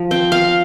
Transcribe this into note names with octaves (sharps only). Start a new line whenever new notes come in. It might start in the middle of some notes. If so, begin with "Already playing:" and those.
Already playing: F3
C4 G5
F5